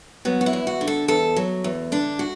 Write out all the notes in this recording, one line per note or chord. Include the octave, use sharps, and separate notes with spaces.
F#3 B3
F#4
E4
E2
F#4
D3
A4
E2 A4
F#3
E2
D3 D4
F#4